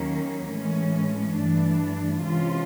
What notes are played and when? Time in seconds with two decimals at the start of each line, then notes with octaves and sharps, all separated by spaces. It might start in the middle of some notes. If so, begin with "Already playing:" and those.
Already playing: D#2 D#3 F#3 A#3 C#4
0.54 A2 E3 G#3 C#4
1.38 G2 E3 A3 D4
2.22 C3 E3 G#3 C#4 F4